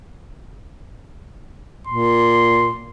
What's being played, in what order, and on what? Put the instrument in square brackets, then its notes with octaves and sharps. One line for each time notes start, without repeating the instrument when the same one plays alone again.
[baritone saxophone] A#2 [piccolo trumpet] C6